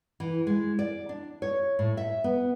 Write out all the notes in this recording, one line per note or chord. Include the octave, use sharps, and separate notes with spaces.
E3
G#3
D5
D4
C#5
A2
E5
B3